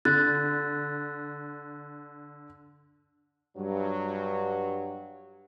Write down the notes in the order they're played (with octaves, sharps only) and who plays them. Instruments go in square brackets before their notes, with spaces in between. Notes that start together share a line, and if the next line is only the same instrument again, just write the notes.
[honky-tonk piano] D3 [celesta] F#6 A6
[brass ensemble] G2 F#3